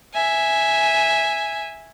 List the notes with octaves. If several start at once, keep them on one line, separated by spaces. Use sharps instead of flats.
E5 G#5